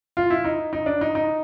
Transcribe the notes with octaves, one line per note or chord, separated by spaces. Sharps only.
F4
E4
D#4
D#4
D4
D#4
D#4